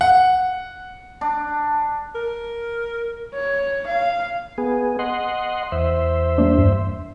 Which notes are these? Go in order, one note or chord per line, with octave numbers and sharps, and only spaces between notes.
F#5
D4
A#4
C#5
F5
B3 G#4
D#5 F#5 C6
E2 C5 E5
G3 A#3 D4
G2